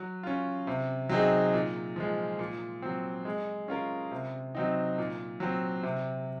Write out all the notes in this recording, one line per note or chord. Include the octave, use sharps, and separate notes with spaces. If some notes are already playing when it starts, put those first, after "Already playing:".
Already playing: F#3
C#4 F4
C3
F#3 C4 D#4 G#4
A#2
F3 G#3
A#2
F#3 C4
G#3
C#4 F4 A#4
C3
F#3 C4 D#4
A#2
F#3 C4
C3